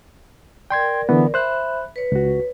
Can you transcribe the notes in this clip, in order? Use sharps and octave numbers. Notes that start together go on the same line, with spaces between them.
A#4 D5 G5 C6 G#6
D3 E3 B3
C5 E5 B5 F#6
B4 C#5
C#2 F#4